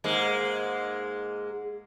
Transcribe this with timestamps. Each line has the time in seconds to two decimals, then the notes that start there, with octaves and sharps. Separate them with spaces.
0.04 G#2 G#3 A#3